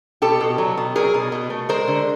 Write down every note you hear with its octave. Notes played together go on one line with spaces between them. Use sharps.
B2 G4 A4
B2
F#3
B2
F#3 G#4 A#4
B2
B2
A3
G#3 A#4 C5
D3